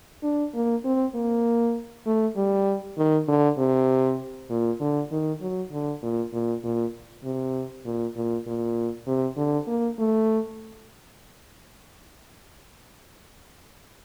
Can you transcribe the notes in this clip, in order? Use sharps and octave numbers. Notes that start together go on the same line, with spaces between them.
D4
A#3
C4
A#3
A3
G3
D#3
D3
C3
A#2
D3
D#3
F#3
D3
A#2
A#2
A#2
C3
A#2
A#2
A#2
C3
D3
A#3
A3